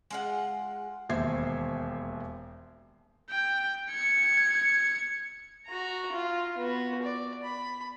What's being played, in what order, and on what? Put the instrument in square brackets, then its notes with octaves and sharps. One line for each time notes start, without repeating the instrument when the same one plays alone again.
[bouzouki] G#3 F4 F#5
[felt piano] E1 D#2 C5 E5 G#6 C7
[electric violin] G5
G#6 C#7
[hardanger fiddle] F#4 A#5
F4
B3 F#4
D5
B5